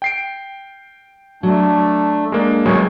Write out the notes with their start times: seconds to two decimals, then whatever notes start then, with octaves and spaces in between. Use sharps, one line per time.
0.02 G5 C7 D7
1.43 F#3 A3 D4
2.32 G#3 A#3 D4
2.65 C#2 F#3 G#3 A3 B3 C#5